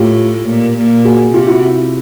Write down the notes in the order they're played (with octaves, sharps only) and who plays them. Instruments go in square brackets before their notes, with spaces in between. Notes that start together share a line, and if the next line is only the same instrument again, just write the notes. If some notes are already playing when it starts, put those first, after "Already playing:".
Already playing: [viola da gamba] A2 [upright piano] F4 G4
[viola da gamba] A#2
A#2
[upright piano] F#4 G#4
[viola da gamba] C3 [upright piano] F4 G4
[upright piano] E4 F#4